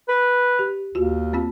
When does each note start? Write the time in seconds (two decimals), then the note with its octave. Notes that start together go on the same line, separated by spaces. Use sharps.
0.09 B4
0.59 G4
0.95 D#2 F4 F#4
1.33 A#3 C4 F4